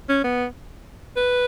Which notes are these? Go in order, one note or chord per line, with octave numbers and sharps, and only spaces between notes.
C#4
B3
B4